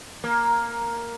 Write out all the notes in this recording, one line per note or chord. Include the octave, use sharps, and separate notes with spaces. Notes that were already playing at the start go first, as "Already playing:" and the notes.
A#3